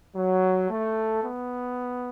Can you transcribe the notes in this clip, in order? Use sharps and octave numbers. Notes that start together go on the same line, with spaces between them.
F#3
A3
B3